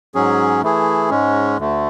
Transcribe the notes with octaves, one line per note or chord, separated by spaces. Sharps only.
G#2 F#3 C#4 G#4
E3 A3 E4 G#4
G#2 G#3 C#4
D2 D3 A3